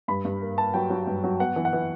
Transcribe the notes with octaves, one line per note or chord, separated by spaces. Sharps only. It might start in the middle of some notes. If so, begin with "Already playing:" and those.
G2 B5
G2
A#3
A#3 A5
F#3 G5
F#3
G2
F#3
B3 F#5
E3
F#5
E3